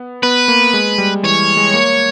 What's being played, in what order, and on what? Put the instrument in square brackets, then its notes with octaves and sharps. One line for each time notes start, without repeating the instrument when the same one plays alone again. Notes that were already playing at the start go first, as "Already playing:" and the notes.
Already playing: [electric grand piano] B3
[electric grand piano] B3 [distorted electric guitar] B4
[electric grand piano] A#3
G#3
G3
[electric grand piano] E3 [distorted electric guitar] C#5
[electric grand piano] G#3
A#3